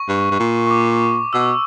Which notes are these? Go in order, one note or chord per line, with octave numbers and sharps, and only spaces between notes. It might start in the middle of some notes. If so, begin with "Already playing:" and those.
Already playing: C#6
G2
G2
A#2
C#6
D6
B2 E6